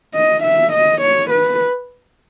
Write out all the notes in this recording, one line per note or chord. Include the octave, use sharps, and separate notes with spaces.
D#5
E5
D#5
C#5
B4